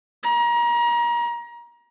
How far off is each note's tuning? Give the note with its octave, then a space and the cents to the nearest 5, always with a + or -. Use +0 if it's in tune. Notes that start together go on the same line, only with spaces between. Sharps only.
A#5 +30